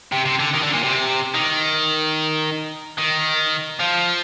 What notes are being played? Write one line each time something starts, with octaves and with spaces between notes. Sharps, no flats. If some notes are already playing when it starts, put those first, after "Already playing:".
C3
C3
D3
D#3
D3
A#2
C3
D#3
D#3
F3